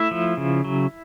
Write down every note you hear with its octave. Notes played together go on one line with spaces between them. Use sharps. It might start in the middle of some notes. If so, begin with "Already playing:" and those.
Already playing: A3 E4 E5
F3
C#3
F#3